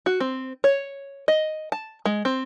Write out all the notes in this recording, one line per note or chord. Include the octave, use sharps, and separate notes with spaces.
F#4
C4
C#5
D#5
A5
G#3
C4